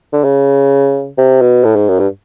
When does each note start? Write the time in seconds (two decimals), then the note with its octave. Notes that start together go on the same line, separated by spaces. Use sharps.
0.13 D3
0.24 C#3
1.18 C3
1.42 B2
1.64 A2
1.76 G#2
1.89 F#2
2.00 G2